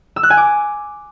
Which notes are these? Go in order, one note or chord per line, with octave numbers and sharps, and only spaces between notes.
E6
F#6
G#5
D6